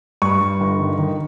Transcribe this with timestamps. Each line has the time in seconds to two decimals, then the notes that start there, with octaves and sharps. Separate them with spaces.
0.22 G2 C#6
0.41 G2
0.61 G1
0.79 D#3
0.98 D#3